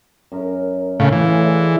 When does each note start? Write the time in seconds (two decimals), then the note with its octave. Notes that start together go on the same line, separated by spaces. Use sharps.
0.32 F#2 A#4
1.00 A2 C#3 F5 G#5
1.13 A2 E3
1.39 G#4 D5 E5